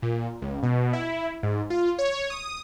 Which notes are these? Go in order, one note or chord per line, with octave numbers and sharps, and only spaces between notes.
A#2
C#2
B2
E4
G#2
F4
C#5
D#6